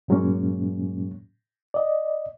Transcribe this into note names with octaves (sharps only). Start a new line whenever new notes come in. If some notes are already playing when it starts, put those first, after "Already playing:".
G2 A#2 F#3 G#3 A#3 C#4
D5 D#5